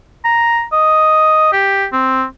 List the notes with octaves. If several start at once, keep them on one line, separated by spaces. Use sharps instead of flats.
A#5
D#5
G4
C4